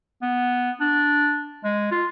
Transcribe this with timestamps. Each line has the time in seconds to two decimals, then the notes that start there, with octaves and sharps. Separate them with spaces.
0.22 B3
0.81 D4
1.64 G#3
1.91 F4